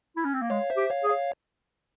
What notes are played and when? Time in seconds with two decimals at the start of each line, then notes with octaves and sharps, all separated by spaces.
0.17 E4
0.25 C#4
0.34 C4
0.42 A#3
0.50 G#3 C#5 F5
0.70 C5 E5
0.77 G4
0.90 C#5 F5
1.04 G#4
1.10 C#5 F5